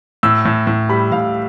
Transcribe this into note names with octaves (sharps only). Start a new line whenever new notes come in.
A2 E6
A2
A2
G3 B5
A2 F5